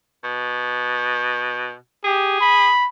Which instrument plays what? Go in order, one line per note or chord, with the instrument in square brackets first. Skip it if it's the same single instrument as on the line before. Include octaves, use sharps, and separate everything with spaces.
[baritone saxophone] B2
[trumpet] G4 [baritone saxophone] G#4
[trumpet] B5